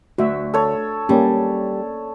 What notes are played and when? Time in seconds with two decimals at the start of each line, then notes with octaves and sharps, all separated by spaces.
0.18 D2 F#4 E5
0.54 A4 C#5
1.09 G3 A#3 C#4